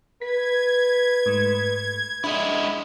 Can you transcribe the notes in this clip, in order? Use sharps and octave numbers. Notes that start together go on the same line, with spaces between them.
B4 G#6 B6
G#2 A3
G#3 D4 E4